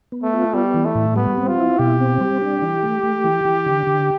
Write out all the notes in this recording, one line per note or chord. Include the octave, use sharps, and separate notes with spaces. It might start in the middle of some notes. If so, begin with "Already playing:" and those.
B3
A3
F4
G3 B3
E3
A3
A2
G3 B3
C4
F4
E4
B2 G4
C4
G3
D4
E3
A3
A3
E3
E3
D3
D3